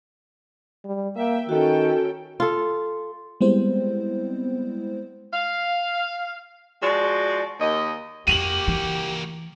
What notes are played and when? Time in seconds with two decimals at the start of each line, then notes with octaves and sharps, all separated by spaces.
0.85 G3
1.16 A#3 E5 G5
1.49 D#3 C#4 F#4 A4 G5
2.40 F4 A4
3.41 G3 G#3 B3 C4 E4 C5
5.33 F5
6.82 F3 G#3 F#4 D5
7.60 D#2 D#5
8.28 F2 A#3 F#4 G4 D#7 F7 F#7
8.68 E3